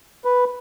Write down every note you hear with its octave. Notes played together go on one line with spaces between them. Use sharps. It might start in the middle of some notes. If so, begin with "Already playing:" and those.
B4